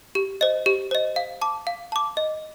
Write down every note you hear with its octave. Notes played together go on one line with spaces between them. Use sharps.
G4
C5 D#5
G4
C5 D#5
F5
A5 D6
F5
A5 D6
D#5